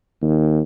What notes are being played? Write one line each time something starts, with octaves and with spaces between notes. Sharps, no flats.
D#2